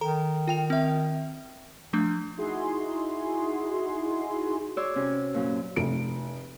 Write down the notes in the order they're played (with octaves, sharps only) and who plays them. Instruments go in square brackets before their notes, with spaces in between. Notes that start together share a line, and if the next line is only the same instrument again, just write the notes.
[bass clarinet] D#3 [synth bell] A4 A#5
[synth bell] F4 G5 F7
C4 E5
F3 A3 D4
[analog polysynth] D#4 E4 F#4 G#4 C6
[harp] F#4 C#5 D5 C6 C#6 E6
C3 C#4
F#2 A#2
[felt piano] F1 D7